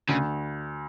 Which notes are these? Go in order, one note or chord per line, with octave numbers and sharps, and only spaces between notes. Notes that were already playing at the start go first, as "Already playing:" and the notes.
D2 C#3